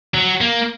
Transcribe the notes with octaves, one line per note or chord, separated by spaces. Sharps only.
F#3
A#3